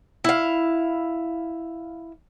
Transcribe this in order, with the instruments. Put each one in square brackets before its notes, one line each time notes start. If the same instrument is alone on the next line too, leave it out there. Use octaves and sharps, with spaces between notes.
[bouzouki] E4 F5